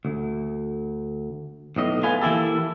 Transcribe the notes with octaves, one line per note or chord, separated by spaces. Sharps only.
D2
B1 A2 D#5
A3 F4 B4 G#5
E3 A#3 E4 G4 A4